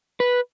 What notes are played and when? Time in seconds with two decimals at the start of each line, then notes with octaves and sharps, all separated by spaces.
0.20 B4